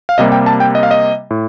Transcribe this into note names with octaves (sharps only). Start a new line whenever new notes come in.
F5
C3 G3 A#3 D#5
G5
A5
G5
D#5
F5
D#5
A2